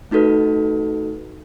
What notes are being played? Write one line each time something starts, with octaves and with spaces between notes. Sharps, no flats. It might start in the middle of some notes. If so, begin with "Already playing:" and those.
A3 D#4 F#4 A4 B4